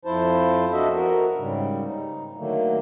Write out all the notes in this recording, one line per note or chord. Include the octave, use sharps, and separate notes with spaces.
F2 F3 E4 C5 A5
D4 F#4 A4 D#5 E5
F#4 A#4
G#2 C#3 G3
D#4
D3 D#3 F#3 A3 A#3